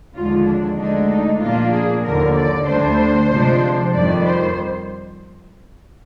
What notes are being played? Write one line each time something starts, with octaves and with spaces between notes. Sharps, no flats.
D#2 D3 F3 G#3 F4
D4
D2 D3 G#3 D4 D#4
D#4
A#2 F3 A#3 D4 F4
G#4
D#2 D3 F3 A#4
D5
D2 D3 G3 D4 C5
C3 F3 G#3 D4
F2 D#3 G3 D5
C5